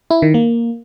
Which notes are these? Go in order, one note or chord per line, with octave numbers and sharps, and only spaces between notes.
E4
D#3
A#3